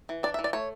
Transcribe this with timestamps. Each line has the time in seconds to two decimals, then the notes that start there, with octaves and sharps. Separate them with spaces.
0.09 E3
0.23 D4 D5
0.34 E5
0.39 E3
0.44 D5
0.53 A3 C#5